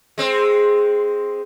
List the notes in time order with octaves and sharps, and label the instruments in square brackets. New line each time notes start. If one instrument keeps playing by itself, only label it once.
[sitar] G#3 C4